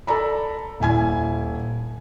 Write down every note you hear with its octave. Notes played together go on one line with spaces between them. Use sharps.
A4 D5 A#5 B5
D#1 E4 G#5 G#6